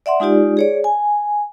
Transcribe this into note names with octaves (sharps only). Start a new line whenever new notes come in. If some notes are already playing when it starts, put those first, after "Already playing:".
D5 E5 F#5 C6
G#3 D#4 F4 G4 D5
G#4 C#5 D5
G#5